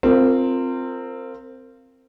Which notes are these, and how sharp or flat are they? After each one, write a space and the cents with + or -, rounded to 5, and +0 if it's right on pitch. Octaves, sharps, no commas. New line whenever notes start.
C4 +0 F4 +0 A#4 -25